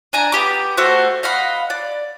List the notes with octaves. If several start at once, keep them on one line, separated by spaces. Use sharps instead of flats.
D4 G#5 A#5
B3 G4 D6
A3 F#4 C5 F#6
D#5 F5 F#5 B5
D5